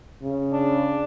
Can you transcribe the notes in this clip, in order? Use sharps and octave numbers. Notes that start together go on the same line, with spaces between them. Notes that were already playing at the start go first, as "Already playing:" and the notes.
C#3
D4